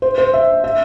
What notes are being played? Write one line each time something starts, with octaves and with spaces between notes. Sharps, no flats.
C5
C5
E5
E5